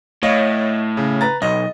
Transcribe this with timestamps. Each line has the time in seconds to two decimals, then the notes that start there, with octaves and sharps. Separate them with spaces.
0.23 A2 C#5 D#5 F5
0.97 C#3
1.21 B4 A#5 A6
1.42 B1 D#5